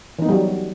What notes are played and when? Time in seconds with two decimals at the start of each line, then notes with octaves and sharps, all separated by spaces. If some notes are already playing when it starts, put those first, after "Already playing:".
0.19 E3
0.22 D#4
0.25 B3
0.29 G3
0.32 F#3